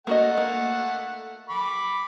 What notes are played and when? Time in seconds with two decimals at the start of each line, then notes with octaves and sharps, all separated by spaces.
0.07 A3 A#3 F#4 D#5 F#5
0.37 A#3
1.50 B5 D6